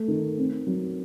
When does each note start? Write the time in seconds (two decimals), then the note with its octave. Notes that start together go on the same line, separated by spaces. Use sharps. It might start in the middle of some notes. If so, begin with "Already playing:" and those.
Already playing: A3
0.08 D#3
0.37 C4
0.67 F#3